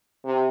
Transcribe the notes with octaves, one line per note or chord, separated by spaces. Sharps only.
C3